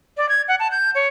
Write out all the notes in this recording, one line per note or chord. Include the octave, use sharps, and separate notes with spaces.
D5
G#6
F#5
A5
G6
C#5